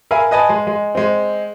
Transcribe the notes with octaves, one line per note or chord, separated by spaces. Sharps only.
A#4 E5 F5 G#5 B5
B4 D#5 G#5 A5 B5
G#3
G#3
G#3 C4